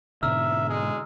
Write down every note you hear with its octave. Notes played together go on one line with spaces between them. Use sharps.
G#2 B2 D3 E5 A#5 E6 F6
G#3